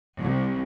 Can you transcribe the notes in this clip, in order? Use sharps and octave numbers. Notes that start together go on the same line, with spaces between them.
C2